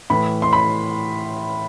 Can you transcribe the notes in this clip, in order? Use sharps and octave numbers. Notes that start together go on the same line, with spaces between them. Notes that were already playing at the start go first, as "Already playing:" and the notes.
A2 E3 B5
C6
B5